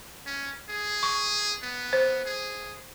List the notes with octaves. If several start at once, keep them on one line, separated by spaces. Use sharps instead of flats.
C#4
G#4
C#6
B3
C5
G#4